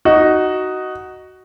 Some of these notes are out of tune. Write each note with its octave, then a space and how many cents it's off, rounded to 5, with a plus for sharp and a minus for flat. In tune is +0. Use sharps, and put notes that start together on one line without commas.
D#4 +0 F#4 +10